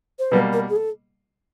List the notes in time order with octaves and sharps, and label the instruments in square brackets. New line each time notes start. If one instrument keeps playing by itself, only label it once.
[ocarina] C5
[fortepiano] B2 G3 A#3 [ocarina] B4
[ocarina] A#4
G#4
A4